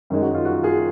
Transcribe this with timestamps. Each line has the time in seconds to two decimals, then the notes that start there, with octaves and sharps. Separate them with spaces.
0.10 F#2 D#3 G#3 D#4
0.22 F#4
0.35 F4
0.45 F#4
0.63 F4 G#4